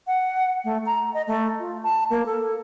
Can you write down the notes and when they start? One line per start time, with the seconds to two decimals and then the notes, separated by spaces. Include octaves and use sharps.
0.07 F#5
0.64 A3
0.86 A#5
1.14 D#5
1.27 A3
1.59 F4
1.83 A5
2.10 A#3
2.26 A4